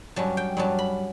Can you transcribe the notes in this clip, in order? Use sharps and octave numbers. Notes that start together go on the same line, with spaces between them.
G2 F#3 C#4 A5
G5
G2 F#3 C#4 A5
B5